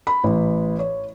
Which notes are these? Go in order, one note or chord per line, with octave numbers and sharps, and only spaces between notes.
B5
A1
C#5